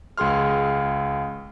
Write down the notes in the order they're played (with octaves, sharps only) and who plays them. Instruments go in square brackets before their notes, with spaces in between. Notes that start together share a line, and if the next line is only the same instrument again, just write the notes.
[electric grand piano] C#2 G#4 C6 F6